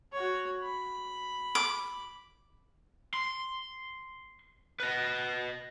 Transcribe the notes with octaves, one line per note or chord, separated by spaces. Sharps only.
F#4 C#5
B5
D6
C6
B4 D#5